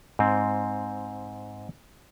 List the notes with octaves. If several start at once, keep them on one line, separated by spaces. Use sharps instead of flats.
G#2 C4